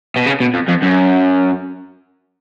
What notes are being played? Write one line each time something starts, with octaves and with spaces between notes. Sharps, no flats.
B2
C#3
B2
F2
F2
F#2